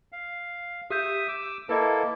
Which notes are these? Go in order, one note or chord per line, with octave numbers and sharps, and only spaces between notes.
F5
G4 E5 D#6 G6
D6 E6
A#3 E4 A4 B4 D#5